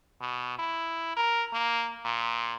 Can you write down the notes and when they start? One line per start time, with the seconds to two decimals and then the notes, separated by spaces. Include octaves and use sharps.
0.20 B2
0.59 E4
1.17 A#4
1.53 A#3
2.04 A#2